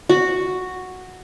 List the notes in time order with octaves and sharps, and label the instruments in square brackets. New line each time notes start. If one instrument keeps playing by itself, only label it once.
[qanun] F#4